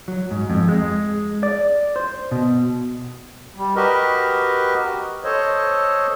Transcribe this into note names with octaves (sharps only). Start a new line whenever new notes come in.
F#3
G#2
F2
G#3
D5
C5
B2
G3
F#4 G4 A#4 B4 D#5
A4 C5 C#5 D#5